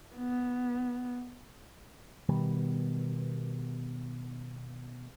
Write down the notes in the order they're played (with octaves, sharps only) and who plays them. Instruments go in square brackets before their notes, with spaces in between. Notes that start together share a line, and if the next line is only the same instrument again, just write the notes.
[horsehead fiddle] B3
[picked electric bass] B2 D#3 G3 B3